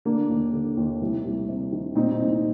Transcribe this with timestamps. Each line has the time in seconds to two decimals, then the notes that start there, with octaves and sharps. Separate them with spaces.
0.05 D3 A#3 D4
0.29 D#2
0.53 D3
0.77 D#2
1.01 C2
1.25 C2
1.49 C3
1.72 D#3
1.95 A#2 C4 D#4
2.11 C4 D#4
2.20 C2